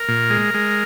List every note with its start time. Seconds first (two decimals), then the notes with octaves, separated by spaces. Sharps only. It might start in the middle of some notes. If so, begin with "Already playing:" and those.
Already playing: A#4
0.08 A#2
0.30 G#3
0.54 G#3